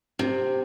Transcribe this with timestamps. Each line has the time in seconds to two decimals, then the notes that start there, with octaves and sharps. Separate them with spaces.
0.19 C3